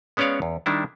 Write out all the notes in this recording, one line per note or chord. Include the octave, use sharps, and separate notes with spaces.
G#3 B3 C#4 C#5 D5 F5
E2
D#3 G3 D4 E4